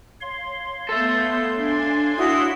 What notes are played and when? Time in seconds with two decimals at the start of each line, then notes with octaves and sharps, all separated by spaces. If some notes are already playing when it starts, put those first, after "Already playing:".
0.21 C#5 F5 C6
0.89 B3 A4 E5 G6
1.54 D4 G#5
2.18 E4 F#4 D#6